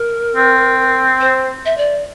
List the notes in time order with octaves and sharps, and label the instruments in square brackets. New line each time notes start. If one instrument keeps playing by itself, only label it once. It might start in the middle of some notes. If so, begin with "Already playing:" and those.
Already playing: [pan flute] A#4
[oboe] C4
[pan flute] C5
E5
D5